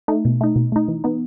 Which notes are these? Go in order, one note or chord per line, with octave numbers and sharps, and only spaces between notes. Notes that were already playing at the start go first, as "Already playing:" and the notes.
A3 D#4
B2
A3 D#4
B2
A3 D#4
E3
B3 D#4